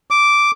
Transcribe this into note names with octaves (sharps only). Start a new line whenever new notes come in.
D6